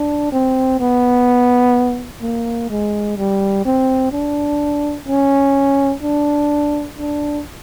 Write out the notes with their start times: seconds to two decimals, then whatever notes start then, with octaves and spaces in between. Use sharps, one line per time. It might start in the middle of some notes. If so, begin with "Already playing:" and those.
Already playing: D4
0.32 C4
0.80 B3
2.22 A#3
2.70 G#3
3.18 G3
3.66 C4
4.12 D4
5.08 C#4
6.03 D4
6.98 D4